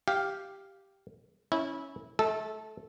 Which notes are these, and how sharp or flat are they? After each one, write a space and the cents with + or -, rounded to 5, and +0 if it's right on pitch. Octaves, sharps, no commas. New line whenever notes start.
G4 +0 F5 +0
C#4 +0 E4 -20
A3 -30 A4 -10